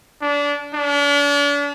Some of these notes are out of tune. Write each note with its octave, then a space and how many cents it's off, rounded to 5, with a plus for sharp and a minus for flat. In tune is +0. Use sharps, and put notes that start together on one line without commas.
D4 -25
D4 -40